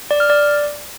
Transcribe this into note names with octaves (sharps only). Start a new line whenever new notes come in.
D5
F6
D5